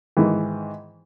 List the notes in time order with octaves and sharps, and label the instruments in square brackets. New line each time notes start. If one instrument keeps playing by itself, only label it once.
[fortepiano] G#2 D#3 E3